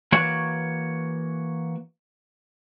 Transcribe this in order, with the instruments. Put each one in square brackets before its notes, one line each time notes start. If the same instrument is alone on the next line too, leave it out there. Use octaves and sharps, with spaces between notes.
[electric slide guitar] E3 A#3 F#4 C#5